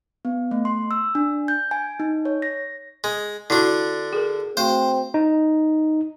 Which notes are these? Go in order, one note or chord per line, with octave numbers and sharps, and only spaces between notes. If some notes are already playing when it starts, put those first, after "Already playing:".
B3
A3
C6
E6
D4
G6
G#5
D#4
C#5
A#6
G#3
D3 D4 E4 F#4
G#4 A#4
A3 C4 F#4 C5
D#4